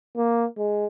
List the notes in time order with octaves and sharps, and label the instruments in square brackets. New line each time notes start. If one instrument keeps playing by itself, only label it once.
[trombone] A#3
G#3